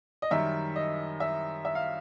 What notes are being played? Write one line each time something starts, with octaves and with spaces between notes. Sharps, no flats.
D#5
F#2 D#3 G3 E5
D#5
E5
E5
F5